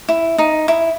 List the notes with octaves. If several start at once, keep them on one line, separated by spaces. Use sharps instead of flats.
E4
D#4
E4